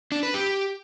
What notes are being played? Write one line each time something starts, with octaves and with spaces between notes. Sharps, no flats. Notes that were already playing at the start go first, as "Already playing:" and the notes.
D4
B4
G4